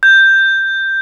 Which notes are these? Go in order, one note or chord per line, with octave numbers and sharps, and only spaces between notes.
G6